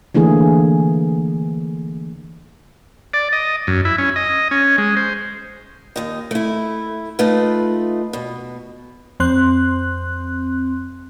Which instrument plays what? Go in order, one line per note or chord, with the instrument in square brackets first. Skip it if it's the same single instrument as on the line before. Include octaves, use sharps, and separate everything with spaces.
[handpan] D3 E3 A3 A#3 G#4
[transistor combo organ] D5
D#5
F#2
E4
C#4
D#5
C#4
G#3
C5
[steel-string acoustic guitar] D#2 D#4
A3 E4
A3 D#4 F4 B4
B2
[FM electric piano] F2 C4 C6 F#6